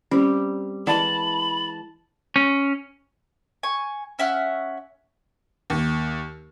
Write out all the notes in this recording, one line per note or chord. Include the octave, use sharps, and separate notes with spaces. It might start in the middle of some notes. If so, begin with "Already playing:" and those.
G3 C4 C#4 A#4
E3 G#3 A#4 D5 A5 B5
C#4
G#5 C#6
C#4 E5 F#5 F6
D#2